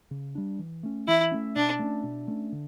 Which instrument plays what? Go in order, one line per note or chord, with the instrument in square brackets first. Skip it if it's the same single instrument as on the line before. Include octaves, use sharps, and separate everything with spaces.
[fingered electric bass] C#3
G3 D4
E3
A3 C#4
[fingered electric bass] E3 [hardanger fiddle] E4
[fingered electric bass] A3 C#4
[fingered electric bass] B2 [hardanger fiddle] D4
[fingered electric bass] A3 C#4
B2
A3 C#4
D3